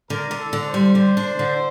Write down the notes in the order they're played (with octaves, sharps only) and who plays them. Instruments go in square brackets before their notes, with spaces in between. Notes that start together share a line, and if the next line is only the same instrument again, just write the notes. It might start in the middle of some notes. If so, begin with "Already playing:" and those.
[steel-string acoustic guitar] D3 [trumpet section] A#4
[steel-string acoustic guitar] D3
[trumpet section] A4
[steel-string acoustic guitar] D3
[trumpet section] C5
[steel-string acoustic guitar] G3
D3
D4
D3